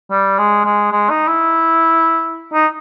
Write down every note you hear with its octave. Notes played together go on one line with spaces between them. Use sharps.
G3
G#3
G#3
G#3
D#4
E4
D#4